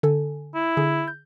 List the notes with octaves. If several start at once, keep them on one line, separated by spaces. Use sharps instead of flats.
D3 A4 G#5
E4
D3 G#4
G6